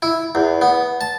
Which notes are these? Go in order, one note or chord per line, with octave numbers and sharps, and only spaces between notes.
E4
E2
B3
A5